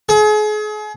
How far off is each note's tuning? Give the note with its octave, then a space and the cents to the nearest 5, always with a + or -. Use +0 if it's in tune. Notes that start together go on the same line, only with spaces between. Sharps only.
G#4 +35